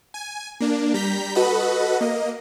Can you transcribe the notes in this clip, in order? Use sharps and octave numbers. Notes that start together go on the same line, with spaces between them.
G#5
A#3 D4
G3 A#5 G6 B6
F#4 A4 B4 D#5 F#5 B5
A#3 D#5